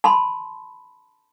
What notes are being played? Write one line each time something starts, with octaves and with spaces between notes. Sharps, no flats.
A5 B5 C6